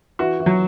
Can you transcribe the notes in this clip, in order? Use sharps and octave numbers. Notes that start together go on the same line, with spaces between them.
E3 F#4
E3
F#3